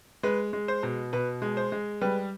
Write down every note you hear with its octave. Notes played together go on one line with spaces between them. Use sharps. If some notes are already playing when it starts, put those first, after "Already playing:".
G#3 B4
G#3
C5
B2
B2 B4
G#3
C5
G#3
G3 B4